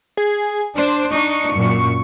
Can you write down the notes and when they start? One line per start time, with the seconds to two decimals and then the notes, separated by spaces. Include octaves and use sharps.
0.17 G#4
0.78 D4 C5
1.11 D4 D#4 C#6
1.55 F#2 A#2